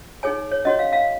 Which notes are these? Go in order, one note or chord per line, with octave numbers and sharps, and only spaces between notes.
D#4 G#4 C#5 G#5
C#5
C#4 F#4 C#5 D#5
F5
F5